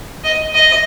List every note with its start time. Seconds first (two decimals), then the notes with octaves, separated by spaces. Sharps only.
0.24 D#5
0.54 D#5